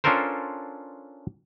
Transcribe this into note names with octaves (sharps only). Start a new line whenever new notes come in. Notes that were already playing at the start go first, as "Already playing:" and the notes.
C#4 D4 F4 A4 A#4 C5